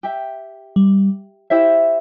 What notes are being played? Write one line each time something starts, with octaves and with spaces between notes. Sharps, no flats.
G4 E5 G5
G3
E4 G4 C5 E5